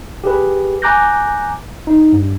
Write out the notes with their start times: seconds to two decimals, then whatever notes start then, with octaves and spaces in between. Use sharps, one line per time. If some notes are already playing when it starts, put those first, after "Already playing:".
0.24 G4 G#4 B4
0.82 G#5 A#5 D6 F#6 G6 A#6
1.87 D#4
2.12 G2